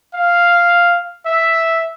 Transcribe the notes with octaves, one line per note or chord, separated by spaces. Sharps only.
F5
E5